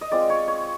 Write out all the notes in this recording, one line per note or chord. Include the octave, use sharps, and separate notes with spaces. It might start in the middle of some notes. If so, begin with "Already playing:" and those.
D#5
G#3 C4 F4 D5
C#5
C#5